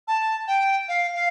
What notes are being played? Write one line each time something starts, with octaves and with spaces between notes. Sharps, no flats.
A5
G5
F5
F5